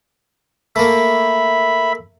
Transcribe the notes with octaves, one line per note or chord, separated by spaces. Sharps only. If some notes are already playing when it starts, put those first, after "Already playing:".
A3 A#3 E5 B5